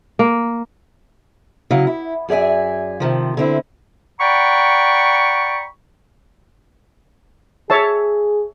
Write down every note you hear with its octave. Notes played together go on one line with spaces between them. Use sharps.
A#3
C#3 F#3 E4 D#5 F5
E4
F#2 G#4 D5 E5 G#5
C3 D#3 F3
D3 C4 E4
D5 F#5 G5 A#5 B5 C#6
G#4 C#5 E5 A5